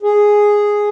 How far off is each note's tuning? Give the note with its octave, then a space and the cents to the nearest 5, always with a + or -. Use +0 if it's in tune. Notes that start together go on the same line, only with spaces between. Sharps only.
G#4 +0